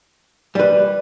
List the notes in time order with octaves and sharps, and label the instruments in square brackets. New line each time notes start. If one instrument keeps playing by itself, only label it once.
[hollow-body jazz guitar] G3 B4 [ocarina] D5